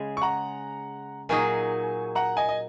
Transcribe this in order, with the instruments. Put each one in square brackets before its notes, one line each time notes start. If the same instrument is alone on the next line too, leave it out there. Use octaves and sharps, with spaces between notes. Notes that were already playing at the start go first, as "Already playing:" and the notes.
Already playing: [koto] C#3 G#3 G#4
[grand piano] C#6
F#5 A#5
[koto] A#2 F#3 D#4 G#4 [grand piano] G#5 C#6
[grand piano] F#5 A#5
D#5 G#5
D#5